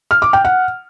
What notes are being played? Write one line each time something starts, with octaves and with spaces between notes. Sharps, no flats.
F6
D6
G5
F#5